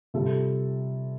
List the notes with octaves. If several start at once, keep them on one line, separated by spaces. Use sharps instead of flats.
C3 G3 F4 A4